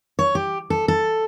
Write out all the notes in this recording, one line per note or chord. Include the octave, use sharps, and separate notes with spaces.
C#5
G4
A4
A4